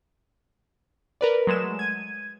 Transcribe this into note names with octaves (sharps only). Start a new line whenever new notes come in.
A#4 B4 D5
F#3 G#3 A3 E7
G#6 D#7